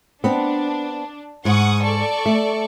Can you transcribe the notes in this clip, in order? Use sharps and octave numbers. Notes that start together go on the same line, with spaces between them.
B3 C4 D4
G#2 F#5 C#6 D#6
A4 D5 C#6
A3